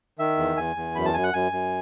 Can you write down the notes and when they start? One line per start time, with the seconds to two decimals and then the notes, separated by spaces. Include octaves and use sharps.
0.19 D#3 E5
0.37 E2
0.57 E2 G#5
0.76 E2
0.95 F#2 B5
1.05 A5
1.14 F#2 G#5
1.24 F#5
1.33 F#2 G#5
1.52 F#2